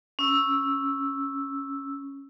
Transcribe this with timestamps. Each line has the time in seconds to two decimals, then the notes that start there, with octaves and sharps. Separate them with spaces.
0.19 C#4 E6